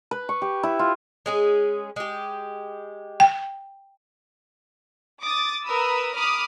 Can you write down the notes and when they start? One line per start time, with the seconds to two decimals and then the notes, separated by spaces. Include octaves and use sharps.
0.11 B4
0.29 C#6
0.42 G4
0.63 E4
0.79 F4
1.26 G#3 C#4 G#4
1.96 G#3 G4
3.20 G5
5.23 D6 D#6 A6
5.64 A#4 B4 B5 D#6 E6
6.15 B5 D6 D#6 F6